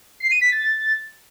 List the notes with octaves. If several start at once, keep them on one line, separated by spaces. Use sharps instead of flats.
C7
D#7
B6
A6